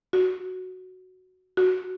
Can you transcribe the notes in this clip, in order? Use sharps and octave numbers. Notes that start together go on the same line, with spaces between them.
F#4
F#4